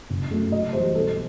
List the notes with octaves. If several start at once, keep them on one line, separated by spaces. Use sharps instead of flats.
F#1
F#2 F#3 A3
F#2 D#5
E3 G3 C5
B1 A4